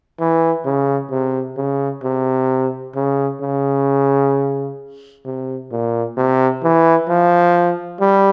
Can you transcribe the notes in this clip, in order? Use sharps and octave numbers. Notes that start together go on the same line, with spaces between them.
E3
C#3
C3
C#3
C3
C#3
C#3
C3
A#2
C3
E3
F3
G3